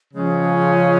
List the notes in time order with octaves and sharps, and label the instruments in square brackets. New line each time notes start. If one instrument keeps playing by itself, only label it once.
[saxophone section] C#3 G#3 C#4 [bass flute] F3